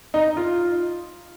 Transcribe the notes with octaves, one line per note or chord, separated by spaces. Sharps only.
D#4
F4